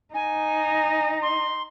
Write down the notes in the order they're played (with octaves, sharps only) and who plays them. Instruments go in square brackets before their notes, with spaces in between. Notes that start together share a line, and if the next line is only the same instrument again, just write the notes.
[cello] D#4 [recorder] G#5
[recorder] C6